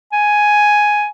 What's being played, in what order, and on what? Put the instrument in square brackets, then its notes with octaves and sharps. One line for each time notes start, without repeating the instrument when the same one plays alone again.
[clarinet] G#5